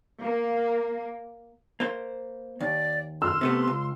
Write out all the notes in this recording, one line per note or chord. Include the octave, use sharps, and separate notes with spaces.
A#3
A#3 C5
D#2 D5
C6 E6 F6
C3 A3 B3
C#2